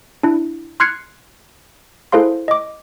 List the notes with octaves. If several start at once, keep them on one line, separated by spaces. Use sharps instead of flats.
D4 E4
C6 F6 F#6 G#6 C7 C#7
E4 G#4 A4 C5 F5 C6
D#5 D6